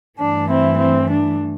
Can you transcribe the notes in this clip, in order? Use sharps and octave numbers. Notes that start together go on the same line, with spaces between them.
G2 E3 A3 D4
C4 E4
C4
D4